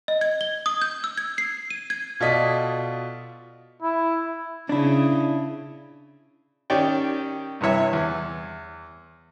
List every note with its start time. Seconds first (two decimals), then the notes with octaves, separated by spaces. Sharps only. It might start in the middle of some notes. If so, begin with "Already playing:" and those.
0.08 D#5
0.21 G#6
0.41 G7
0.66 D#6
0.82 G6
1.04 E6
1.17 G#6
1.38 C7
1.70 D#7
1.90 G#6
2.20 B2 F4 A4 D5 D#5 B6
3.82 E4
4.69 C#3 D4 E4
6.70 D#3 C#4 G4 D5 G5
7.61 G2 C3 E3 C#5 E5
7.93 E2